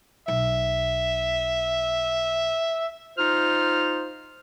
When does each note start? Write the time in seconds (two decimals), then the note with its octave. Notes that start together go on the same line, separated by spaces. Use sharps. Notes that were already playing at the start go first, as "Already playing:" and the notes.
0.28 B1 E5
3.18 D#4 F4 C5 F6